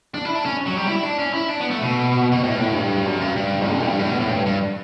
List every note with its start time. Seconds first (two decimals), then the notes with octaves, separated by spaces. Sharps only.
0.14 D4
0.25 E4
0.35 D4
0.45 C#4
0.66 F#3
0.77 G3
0.87 E4
1.03 D4
1.19 C#4
1.33 E4
1.49 D4
1.60 B3
1.71 A3
1.81 B2
2.32 B2
2.43 A2
2.52 B2
2.59 A2
2.74 G2
3.06 F#2
3.21 G2
3.36 G2
3.68 D3
3.83 G2
3.99 A2
4.09 B2
4.20 A2
4.31 G2
4.46 G2